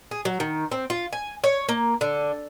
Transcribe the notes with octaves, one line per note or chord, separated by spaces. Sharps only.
G#4
F#3
D#3
C4
F4
G#5
C#5
A#3
D3